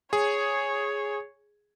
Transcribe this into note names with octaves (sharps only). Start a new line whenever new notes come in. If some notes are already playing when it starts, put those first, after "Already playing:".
G#4 C#5